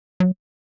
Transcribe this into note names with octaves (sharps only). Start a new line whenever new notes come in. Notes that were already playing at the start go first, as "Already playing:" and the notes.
F#3